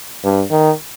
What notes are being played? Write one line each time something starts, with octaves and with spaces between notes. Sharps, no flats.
G2
D#3